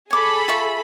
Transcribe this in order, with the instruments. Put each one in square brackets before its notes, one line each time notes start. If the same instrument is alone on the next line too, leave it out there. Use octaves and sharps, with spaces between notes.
[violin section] G#4 A4 B5 [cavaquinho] C#5 D6
[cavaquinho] F4 E5 C#6